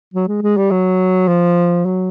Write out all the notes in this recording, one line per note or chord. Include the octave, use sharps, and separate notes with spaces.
F#3
G#3
G#3
G3
F#3
F3
F#3